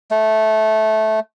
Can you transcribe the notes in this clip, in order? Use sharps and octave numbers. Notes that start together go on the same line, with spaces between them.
A3